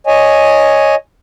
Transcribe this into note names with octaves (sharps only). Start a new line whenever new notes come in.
C#5 D#5 G#5